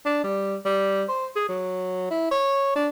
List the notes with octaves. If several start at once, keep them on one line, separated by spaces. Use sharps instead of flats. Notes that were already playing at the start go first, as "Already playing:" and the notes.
D4
G3
G3
C5
G#4
F#3
E4
C#5
D4